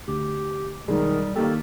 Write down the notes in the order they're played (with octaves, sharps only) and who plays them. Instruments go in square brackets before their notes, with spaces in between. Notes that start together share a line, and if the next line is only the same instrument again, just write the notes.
[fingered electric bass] D2 [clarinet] G4
[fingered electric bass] B1 [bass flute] D#3 [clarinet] G3 [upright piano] G#3
[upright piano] D#3 G4 [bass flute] A#3 [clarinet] A4